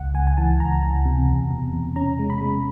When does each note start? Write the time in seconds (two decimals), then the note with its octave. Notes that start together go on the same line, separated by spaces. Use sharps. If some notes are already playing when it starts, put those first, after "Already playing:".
Already playing: C#2 F#5
0.14 C#2 G#5
0.27 G#5
0.37 E3 A5
0.60 C#2 A#5
0.83 C#2
1.05 C3
1.28 E2
1.51 B2
1.73 E2
1.96 C#4 A#5
2.19 G#3
2.30 B5
2.41 G#3